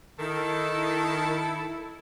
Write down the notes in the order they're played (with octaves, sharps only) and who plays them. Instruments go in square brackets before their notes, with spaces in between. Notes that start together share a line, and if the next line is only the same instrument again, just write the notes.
[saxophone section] D#3 [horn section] E4 A4